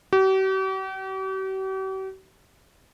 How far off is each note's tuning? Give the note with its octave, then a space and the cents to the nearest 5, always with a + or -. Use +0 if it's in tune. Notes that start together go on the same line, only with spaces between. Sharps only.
G4 -45